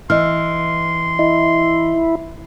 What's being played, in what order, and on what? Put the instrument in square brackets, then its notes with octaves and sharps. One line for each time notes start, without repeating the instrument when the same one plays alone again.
[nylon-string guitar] E3 [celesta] D#5 F6 [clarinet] C6
[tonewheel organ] E4 [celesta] D#5